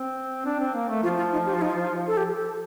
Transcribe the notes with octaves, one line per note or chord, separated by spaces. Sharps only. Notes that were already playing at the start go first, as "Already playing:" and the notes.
Already playing: C4
D4
C4
A#3
A3
F3 F4
F4
D#4
G4
F4
D#4
F4
A4
G4
A4